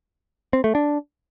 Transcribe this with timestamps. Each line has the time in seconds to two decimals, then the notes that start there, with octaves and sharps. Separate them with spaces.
0.53 C4
0.64 A3
0.75 D4